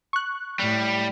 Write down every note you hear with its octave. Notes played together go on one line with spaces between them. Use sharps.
C#6 F#6
A2 G3